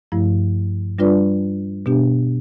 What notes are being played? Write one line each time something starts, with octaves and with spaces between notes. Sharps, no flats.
G2 F3 A3 E4
G3 D4 F4 B4 D5
B2 B3 D4 G4